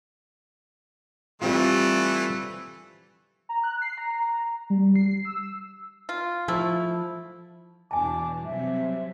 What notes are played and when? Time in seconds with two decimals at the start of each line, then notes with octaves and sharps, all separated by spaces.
1.42 E3 G3 A3 C4 F4
3.49 A#5
3.64 F#6
3.82 C7
3.98 A#5
4.70 G3
4.96 C7
5.25 E6
6.09 F4
6.48 F3 A3 E4
7.91 E2 B2 D4 G#5 A5 D6
8.45 C3 F#3 G3 E5